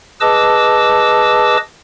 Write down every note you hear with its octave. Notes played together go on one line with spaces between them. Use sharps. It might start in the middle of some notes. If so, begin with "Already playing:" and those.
G#4 B4 D#5 A5 D6 E6